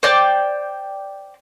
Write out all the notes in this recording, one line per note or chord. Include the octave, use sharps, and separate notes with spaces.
C5 D5 G5